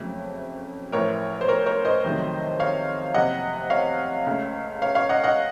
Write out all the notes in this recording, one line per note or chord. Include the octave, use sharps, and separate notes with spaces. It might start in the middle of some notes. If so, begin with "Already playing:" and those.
Already playing: F#1 F2 C#3 F#3 A3
A1 A2 F3 A#4 C#5
C5
A#4 C#5
A#4 C#5
C5 D#5
F2 C3 D#3 F#3 A3
C#5 F5
F#1 F2 C3 D#5 F#5
C#5 F5
C#2 C#3 A3
C#5 F5
C#5 F5
D#5 F#5
D#5 F#5